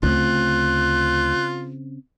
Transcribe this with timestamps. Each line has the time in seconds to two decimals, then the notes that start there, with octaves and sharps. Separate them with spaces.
0.03 D2 C#3 C4 F4 F#6